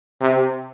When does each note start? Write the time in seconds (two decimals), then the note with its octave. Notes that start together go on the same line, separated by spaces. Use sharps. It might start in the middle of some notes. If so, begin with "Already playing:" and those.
0.21 C3